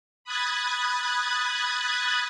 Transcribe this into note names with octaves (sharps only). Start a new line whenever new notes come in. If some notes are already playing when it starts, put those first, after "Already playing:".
B5 D#6 F#6 G#6 A6